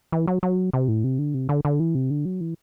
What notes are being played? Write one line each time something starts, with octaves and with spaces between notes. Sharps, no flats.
E3
F#3
F#3
C3
A2
C3
D3
C3
D3
D3
E3
C3
D3
F#3
E3